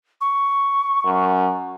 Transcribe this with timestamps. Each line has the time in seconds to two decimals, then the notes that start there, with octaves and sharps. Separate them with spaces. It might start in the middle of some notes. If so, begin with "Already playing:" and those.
0.21 C#6
1.06 F#2